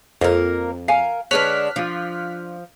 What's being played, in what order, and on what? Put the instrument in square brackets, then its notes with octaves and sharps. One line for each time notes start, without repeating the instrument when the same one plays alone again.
[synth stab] F2 [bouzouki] A#3 A#4
[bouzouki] A#4 [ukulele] F5 G#5
[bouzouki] D3 G#3 D4 [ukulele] B4 C#5 [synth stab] F6 F#6 B6
[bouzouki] F3 [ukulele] D4 F4